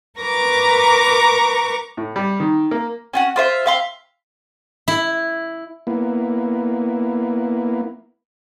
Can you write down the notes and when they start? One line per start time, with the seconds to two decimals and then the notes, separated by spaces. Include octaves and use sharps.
0.20 A#4 B4 A#5 C#6 D6
1.97 A2
2.16 G3
2.40 D#3
2.71 A#3
3.14 C#4 F4 F#4
3.36 F4 C5 E5
3.66 E5 F5 C6
4.88 E4
5.87 A#3 B3 E4